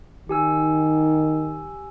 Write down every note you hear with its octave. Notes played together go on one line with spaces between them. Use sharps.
D#3 G4 G#5 E6